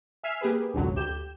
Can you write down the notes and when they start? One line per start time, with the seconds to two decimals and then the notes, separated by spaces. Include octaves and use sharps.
0.23 E5 G#5 E6 F6 B6 C7
0.41 A#3 G4 G#4 B4
0.74 G#1 C#2 F#2 B2 D3 F#3
0.95 D2 G4 G6 E7